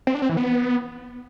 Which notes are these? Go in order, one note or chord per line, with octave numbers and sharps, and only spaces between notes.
C4
D4
C4
E3
B3